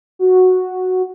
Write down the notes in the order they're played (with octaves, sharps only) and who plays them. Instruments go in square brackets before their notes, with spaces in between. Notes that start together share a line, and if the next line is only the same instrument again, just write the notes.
[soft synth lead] F#4